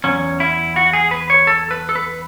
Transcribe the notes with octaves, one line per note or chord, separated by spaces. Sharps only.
E2 B2 F#3 C#4
E4
F#4
G#4
B4
C#5
A4
B4
A4
B4